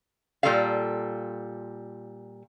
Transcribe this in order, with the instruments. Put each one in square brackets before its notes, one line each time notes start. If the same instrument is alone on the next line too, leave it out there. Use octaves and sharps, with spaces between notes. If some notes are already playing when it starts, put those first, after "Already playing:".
[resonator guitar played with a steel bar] A#2 G3 A#3 F4 A4 F5